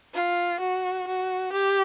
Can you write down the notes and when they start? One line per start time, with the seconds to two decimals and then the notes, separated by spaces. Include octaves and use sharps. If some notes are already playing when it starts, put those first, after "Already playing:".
0.14 F4
0.60 F#4
1.07 F#4
1.52 G4